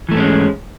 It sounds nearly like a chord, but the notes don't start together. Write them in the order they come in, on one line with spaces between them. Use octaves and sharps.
E3 A3 G#2 C#4 G#3